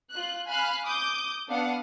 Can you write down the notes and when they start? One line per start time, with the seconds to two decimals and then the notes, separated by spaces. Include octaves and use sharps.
0.11 F4 F#6
0.50 F5 G#5 B5 F6 F#6
0.86 D6 D#6 G6
1.48 B3 D4 F5 F#5 D#6